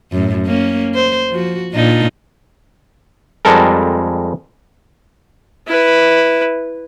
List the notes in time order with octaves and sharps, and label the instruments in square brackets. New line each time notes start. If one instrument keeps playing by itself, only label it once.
[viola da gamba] F#2 A2
A#3 C#4
C5
F3 F#4
A#2 D4 D#4
[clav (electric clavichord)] F2 G3 G#3 A4 A#4
[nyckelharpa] E4 B4